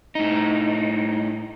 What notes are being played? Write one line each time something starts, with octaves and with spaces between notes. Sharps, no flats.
A2 D#4